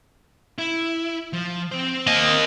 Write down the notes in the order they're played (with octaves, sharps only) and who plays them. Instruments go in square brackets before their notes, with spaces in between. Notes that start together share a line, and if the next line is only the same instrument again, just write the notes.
[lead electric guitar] E4
F3
C4 C5
[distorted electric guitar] A#3 D#5